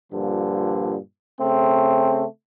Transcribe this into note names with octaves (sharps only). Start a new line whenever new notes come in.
G2 A#2 D3 F3
C#3 A3 C4